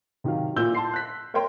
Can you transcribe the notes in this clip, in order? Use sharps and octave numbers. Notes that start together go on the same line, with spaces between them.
C3 D#3 F#3 F5
A#2 E4 E6 G6 G7
A5 C6 C7
F#6 B6
A#4 C#5 E5 G5 C6